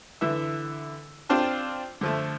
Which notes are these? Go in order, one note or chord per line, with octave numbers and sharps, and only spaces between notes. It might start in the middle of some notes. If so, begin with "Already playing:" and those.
D3 E3 E5
C4 D4 F4 A5
D3 F3 A3